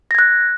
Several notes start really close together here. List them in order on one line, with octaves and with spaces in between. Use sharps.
A#6 G#6 F#6